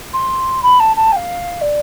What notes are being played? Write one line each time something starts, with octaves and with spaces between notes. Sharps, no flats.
C6
B5
A5
A5
G5
F5
D5